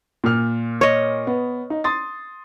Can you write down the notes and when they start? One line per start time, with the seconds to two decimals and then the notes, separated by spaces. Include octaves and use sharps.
0.24 A#2 F6
0.81 C#5 D#5
1.27 B3
1.70 D#4
1.84 C6 D#6 A6